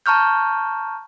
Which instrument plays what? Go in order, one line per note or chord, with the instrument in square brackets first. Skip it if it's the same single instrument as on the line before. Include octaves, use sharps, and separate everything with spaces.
[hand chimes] A5 A#5 C#6 F6 G6